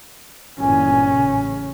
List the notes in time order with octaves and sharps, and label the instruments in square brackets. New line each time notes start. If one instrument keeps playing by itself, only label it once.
[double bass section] G1 A#2 E3 [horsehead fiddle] C#4 [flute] G#5
[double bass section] A1 C#3